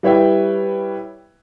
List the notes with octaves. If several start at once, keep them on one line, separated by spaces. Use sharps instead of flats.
G3 E4 B4 C#5 E5 G5